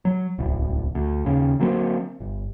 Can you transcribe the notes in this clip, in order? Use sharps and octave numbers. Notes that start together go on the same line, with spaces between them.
F#3
D1 C2
D2
D#2 C#3
D3 F#3 A#3 C4
G1